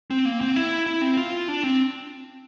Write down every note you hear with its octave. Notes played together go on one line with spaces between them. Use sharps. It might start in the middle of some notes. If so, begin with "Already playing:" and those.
C4
A#3
C4
E4
E4
C4
F4
D4
C4